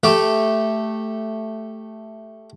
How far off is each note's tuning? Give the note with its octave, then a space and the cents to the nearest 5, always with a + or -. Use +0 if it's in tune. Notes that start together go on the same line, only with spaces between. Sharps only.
A3 +0 G4 +0